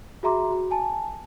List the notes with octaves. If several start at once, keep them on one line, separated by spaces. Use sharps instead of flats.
F#4 G#4 E5 A#5 C6 D6
F#4
G#5 A5